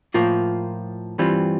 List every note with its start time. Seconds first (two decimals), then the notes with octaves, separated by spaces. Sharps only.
0.14 A2 F3 A#3 F4 A#4
1.18 G2 E3 G3 C4 F4